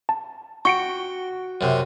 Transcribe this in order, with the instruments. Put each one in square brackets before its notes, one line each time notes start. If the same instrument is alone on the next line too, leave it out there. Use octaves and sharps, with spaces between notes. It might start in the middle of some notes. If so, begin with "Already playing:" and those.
[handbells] A5
[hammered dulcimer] F#4 [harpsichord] G5 [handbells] C#6 C#7 D7
[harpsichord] F#2 C3